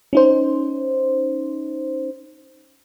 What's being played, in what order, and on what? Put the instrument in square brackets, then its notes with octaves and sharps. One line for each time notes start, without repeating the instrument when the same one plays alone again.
[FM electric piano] C#4 D#4 C5